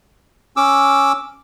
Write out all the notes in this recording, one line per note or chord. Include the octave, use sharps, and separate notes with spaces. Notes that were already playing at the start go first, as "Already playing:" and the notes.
C#4 D6 E6